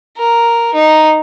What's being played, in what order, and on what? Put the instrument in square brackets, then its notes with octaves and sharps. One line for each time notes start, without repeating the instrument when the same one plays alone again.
[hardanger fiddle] A#4
D#4